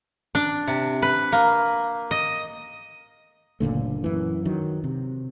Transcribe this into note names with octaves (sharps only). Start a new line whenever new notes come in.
D4
C3
B4
A#3
D#5
F#1 A#2 D3 A3
F#2 E3
D#3 F#3
C3